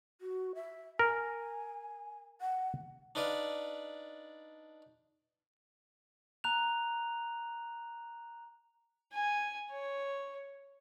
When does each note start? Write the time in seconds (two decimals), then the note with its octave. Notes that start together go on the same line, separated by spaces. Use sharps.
0.21 F#4
0.55 E5
0.99 A#4 G#5
2.41 F#5
3.15 D4 D#4 B4 D5 F5
6.44 A#5 F#6 F7
9.14 G#5
9.72 C#5